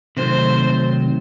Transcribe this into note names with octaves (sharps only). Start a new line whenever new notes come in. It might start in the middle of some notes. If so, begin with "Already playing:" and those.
C3 D#3 F#3 A3 C5